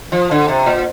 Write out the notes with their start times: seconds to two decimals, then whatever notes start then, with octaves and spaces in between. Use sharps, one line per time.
0.12 F3
0.31 D3
0.48 C3
0.66 A#2